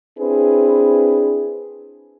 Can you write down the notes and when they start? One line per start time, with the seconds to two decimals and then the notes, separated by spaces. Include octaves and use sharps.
0.19 C4 D4 E4 G#4 B4